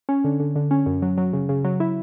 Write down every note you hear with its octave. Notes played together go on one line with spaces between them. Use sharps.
C#4
D3
D3
D3
C#4
F#2
F#3
F#3
C#3
C#3
F#3
E4